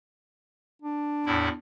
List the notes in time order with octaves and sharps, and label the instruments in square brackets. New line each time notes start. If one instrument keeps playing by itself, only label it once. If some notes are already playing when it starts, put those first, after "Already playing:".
[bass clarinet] D4
[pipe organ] E2 A2 E4